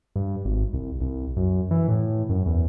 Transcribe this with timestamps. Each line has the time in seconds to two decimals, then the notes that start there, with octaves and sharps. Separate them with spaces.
0.16 G2
0.45 G#1
0.74 C2
1.01 C2
1.37 F#2
1.71 E3
1.88 A2
2.29 F#2
2.46 E2